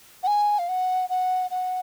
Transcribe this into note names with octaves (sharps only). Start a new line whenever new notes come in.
F#5
G#5
F5
F#5
F#5
F#5